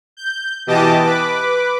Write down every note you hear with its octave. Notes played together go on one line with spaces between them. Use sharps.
G6
B2 E3 G4 D#5 A5 D6
B4 D6